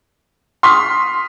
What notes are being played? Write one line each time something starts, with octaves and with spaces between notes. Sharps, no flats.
C6 D#6 F6 B6